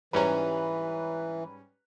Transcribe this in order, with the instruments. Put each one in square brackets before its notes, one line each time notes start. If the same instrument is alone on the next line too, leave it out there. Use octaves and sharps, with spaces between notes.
[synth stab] G#2 G3 C#4 [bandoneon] E3 [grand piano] B4 A#5